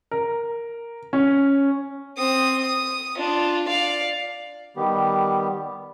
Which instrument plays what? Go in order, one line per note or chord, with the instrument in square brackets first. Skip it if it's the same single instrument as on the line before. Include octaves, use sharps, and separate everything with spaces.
[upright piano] A#4
C#4
[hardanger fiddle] C4 D#6
D#6
D4 F4
D5 F5
[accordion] D#3 G3 B3 G4